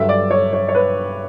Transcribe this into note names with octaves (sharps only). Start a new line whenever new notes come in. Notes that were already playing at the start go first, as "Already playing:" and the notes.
Already playing: G2 D3 F#3 E5
D5
C#5
C#5
C#5
B4